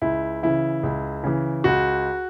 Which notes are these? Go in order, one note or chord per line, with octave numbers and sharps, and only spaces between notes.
C#2 E4
C#3 E3 E4
C#2
C#3 E3
C#2 F#4